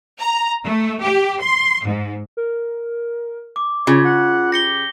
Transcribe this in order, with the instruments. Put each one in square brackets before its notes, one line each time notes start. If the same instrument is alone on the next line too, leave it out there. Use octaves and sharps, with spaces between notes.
[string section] A#5
A3
G4
C6
G#2
[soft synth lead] A#4
[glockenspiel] D6
[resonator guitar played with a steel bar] C#3 [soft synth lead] F4 [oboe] C#5
[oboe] F#5
[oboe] G4 [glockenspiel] A#6 C#7 G7